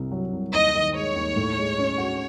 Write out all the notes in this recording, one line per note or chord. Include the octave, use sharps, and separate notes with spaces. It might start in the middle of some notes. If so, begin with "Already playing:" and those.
Already playing: C2 C3
F#3
C2
D#2 D#5
D#3
G#3 C#5
D#2
A2
G#3
C#4
F#4